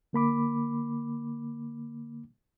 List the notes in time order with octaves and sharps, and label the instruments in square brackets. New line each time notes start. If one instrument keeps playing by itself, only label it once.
[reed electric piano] D3 A#3 B5 D6